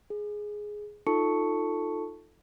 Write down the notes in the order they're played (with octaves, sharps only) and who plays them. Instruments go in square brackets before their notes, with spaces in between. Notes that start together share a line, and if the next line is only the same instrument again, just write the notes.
[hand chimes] G#4
D#4 F4 A4 A5 C#6 C#7